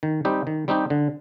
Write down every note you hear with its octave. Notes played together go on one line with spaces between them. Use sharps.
D#3
G3 C4 D#4 G4
D#3
G3 C4 D#4 G4
D3